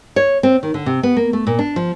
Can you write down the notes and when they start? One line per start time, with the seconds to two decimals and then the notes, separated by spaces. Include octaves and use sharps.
0.16 C#5
0.43 C4
0.63 D#3
0.74 D3
0.86 C3
1.03 B3
1.17 A#3
1.33 A3
1.47 A#2
1.59 D4
1.76 F3